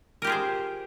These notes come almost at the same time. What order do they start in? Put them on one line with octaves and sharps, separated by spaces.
A#4 G4 F4 G#4 C5